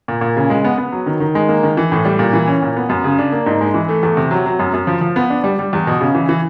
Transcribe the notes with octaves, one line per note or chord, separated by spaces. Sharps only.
A#2
A#2
C#3
G#3
B3
B3
F#3
D#3
D#3
G#3
A#3
D#3
E3
A2
G3
A#2
E3
C#4
A#2
B3
F#2
C#3
D4
A#3
G#2
G#3
E3
A3
E2
C3
F#3
F#3
F#2
F#2
F3
F3
B3
D4
G3
G3
E2
B2
C#3
E3
E3